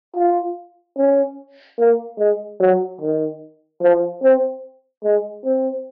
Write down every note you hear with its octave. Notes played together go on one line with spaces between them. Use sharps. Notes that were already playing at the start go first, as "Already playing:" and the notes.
F4
C#4
A#3
G#3
F#3
D#3
F3
C4
G#3
C4